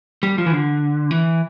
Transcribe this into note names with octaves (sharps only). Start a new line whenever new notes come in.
G3
F3
E3
D3
E3